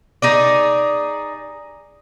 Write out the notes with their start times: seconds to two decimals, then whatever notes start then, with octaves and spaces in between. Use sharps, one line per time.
0.22 D#4 G#4 D5